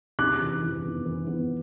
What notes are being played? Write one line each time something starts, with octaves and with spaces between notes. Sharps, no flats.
C3 D6 F#6
E3
E3
B3
E3
B3